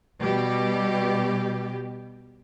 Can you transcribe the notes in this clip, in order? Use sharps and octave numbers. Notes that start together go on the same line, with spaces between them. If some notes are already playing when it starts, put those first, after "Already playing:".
B2 G3 G4